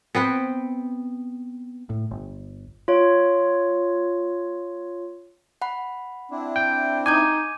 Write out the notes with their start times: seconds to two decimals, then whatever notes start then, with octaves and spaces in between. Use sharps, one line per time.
0.15 B3 C4 B4 G5
1.90 A2
2.11 G1
2.88 F4 C#5
5.62 F#5 B5
6.31 C4 D4 E4
6.56 G5
7.06 D#4 G#5 D6 G6 G#6